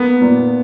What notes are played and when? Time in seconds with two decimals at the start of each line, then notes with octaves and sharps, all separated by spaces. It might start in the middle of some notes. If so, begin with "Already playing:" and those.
Already playing: A#3 B3
0.21 A#2